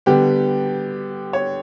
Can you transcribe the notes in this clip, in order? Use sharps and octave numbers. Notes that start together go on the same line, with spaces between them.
D3 G3 B3 G4
C#5